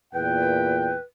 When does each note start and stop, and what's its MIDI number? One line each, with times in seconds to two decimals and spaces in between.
0.14 0.94 40
0.14 0.94 46
0.14 1.01 71
0.14 1.00 79